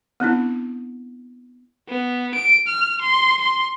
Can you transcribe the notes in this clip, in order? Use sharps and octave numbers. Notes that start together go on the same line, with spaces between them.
B3 C4 D4 E4
B3
D7
F6
C6
C6